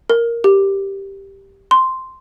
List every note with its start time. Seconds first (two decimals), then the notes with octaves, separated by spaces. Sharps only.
0.10 A#4
0.44 G4
1.71 C6